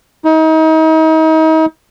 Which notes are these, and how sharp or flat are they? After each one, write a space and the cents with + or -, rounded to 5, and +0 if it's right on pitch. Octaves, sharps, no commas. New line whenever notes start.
D#4 +35